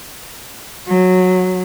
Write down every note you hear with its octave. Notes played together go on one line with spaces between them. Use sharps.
F#3